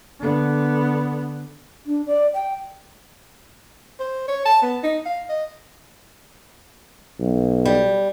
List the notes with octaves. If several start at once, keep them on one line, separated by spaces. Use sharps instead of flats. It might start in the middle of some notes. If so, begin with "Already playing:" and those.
D3 B3
D4
D5
G5
C5
C#5
A5
B3
D#4
F5
D#5
B1
G3